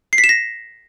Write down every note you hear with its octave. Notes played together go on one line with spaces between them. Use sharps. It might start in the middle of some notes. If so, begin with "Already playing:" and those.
C7
B6
E7
A#6